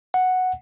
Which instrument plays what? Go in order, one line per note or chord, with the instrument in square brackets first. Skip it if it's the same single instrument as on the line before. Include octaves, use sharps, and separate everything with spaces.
[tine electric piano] F#5